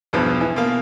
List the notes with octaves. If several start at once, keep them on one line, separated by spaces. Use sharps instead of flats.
B1 E2 G2 B2 F3 B3
E3
B2 A#3 F5